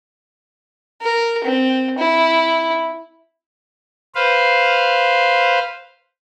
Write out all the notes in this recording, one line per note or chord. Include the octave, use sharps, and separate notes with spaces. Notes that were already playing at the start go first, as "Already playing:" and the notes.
A#4
C4
E4
B4 C5 F5